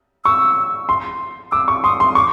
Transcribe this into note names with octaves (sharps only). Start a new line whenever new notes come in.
C#6 E6
C6
D6 E6
C#6
C6 D#6
C6
C#6 D6